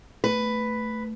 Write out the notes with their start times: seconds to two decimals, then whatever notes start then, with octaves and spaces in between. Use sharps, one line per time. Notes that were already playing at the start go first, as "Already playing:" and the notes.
0.24 A3 B4